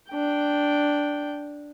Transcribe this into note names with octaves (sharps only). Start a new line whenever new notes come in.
D4 G5